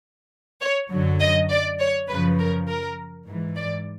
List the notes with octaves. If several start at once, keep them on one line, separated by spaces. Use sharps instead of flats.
C#5
F#2 D3 F#3
D#5
D5
C#5
F#2 C#3 F3 B4
A#4
A#4
G#2 E3
D5